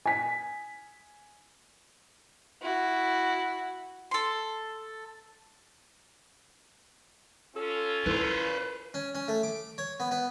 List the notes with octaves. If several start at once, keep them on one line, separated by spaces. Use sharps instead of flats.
G#5 B6
E4 F#4
A4 C6
C#4 F4 A4
E4 B4 C5
C#4
C#4
A3
D6
C#5
B3
B3